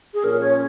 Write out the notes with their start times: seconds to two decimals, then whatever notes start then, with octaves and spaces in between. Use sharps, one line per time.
0.14 G#4
0.24 A#2 F3 C#4 A#4
0.40 C#5